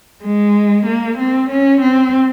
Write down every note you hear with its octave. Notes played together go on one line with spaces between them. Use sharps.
G#3
A#3
C4
C#4
C4